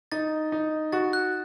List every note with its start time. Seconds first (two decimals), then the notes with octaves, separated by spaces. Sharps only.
0.12 D#4 A6
0.52 D#4
0.92 F#4 A6
1.13 F#6